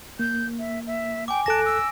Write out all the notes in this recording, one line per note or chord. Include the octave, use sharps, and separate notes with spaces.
A#3 G6
E5
E5
G5 G#5 D6
D#2 A4 A5 F#6 A#6 D7
E6